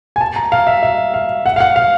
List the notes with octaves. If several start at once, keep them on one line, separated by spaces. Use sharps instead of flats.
G#5
A5
A#5
F5
E5
E5
F5
F#5
F5
F#5
F5